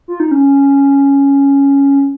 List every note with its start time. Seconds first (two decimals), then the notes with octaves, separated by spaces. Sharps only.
0.08 F4
0.20 D#4
0.31 C#4